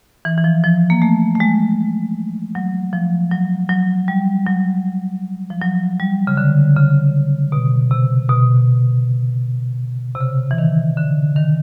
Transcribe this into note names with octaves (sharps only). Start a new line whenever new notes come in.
E3
E3
F3
F3
A#3
A3
A3
G#3
F#3
F3
F#3
F#3
G3
F#3
F3
F#3
G3
C#3
D3
C#3
B2
C3
B2
C3
C#3
E3
D#3
D3
D#3